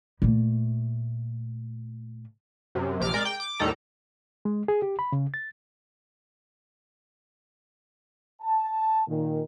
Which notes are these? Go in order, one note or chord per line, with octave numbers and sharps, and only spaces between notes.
A#2 A3
F#2 C3
A#1 C3 D6 F6
G#3 A#4 D5 D6
G5
D6
D#2 A2 D#3 G3 A4 A#5
G#3
G#4
G4
B5
C#3
A6
A5
A#2 D#3